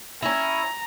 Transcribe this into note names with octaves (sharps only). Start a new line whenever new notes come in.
C#4 E4 A#5